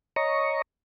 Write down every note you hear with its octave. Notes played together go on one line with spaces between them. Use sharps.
C#5 D#5 A#5 C#6